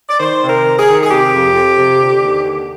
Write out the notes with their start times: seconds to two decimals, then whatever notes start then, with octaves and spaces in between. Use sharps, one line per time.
0.09 D5
0.19 D#3 C5
0.42 C3
0.49 A#4
0.64 D#3
0.79 G#4
0.87 D#3
1.02 G#4
1.10 C3 G4
1.32 F2
1.54 F2
1.76 C3
2.00 D3
2.21 D#2
2.44 D3